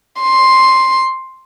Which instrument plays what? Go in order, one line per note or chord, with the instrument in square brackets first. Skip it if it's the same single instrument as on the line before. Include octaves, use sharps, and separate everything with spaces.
[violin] C6